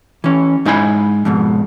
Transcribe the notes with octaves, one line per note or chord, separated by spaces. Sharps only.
E3 C#4
G#2 D#4 E4 G#5 B5
F2 G#2 B2